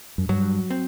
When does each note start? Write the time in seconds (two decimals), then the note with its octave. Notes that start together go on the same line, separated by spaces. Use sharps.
0.18 F#2
0.29 G2 F#3
0.70 C4